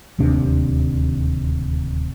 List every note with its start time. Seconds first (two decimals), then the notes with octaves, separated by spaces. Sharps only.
0.18 D1 D#2 C3 D4